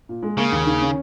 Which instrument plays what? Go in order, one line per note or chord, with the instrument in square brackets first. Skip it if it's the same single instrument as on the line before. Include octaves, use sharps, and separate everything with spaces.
[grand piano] A#2
G#3
[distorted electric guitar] C#3 [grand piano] A#3
[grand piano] D#2
D#3
C#4